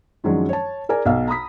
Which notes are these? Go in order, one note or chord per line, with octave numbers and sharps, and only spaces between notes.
F#2 D#3 F3 F#3 G#3 D4
C#5 A5
G#4 A#4 D5 G#5
B1 F5 A5
A#5 B5 D#6 B6